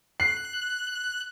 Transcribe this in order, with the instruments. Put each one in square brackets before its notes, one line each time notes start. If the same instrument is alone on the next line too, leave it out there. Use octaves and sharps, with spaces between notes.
[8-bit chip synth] F#6 [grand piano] C7